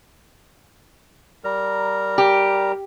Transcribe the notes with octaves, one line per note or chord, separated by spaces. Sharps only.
G3 A#4 A#5
G4